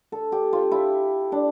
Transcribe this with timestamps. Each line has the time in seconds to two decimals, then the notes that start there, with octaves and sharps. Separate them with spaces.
0.12 A4
0.32 G4
0.53 F4
0.71 E4
1.32 D4